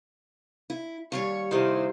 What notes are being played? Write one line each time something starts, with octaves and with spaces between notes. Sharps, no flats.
E4
D#2 G3 C#5 C#6
C3 D#3 E4 C5